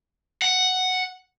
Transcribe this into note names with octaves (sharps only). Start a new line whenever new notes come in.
F#5